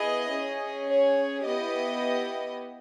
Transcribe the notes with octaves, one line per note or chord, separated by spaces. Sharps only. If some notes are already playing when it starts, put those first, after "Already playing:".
Already playing: B3 E4 G#4 D#5
C#4 G#4
C#5
B3 E4 G4 D#5